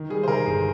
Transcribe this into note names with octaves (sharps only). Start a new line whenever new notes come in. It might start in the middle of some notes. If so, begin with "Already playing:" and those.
Already playing: D#3
G3 G#4
C5
D#3 A#4
G1 G#4